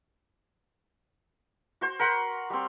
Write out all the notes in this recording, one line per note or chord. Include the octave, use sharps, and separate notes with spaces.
F#4 C5
A#4 F#5 B5 C6
G3 C4